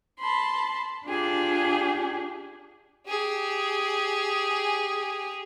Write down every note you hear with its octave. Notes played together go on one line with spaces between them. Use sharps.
A5 B5 C6
D4 F4 G4 G#4
G4 G#4